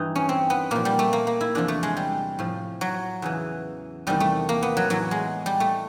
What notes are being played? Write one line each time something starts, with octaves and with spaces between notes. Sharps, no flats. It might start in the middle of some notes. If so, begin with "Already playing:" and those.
Already playing: G2 E3 D#4
C#4
C4
B3
A#2 F3 A#3
G3
A3
A#3
A#3
E4
E2 C3 F3 D4
A3
G#3
G3
A2 F3
F#3
E2 C#3 E3
E2 C3 D#3 G3
A3
A#3
B3
F#3
A2 E3 F#3
G#3
G3
A3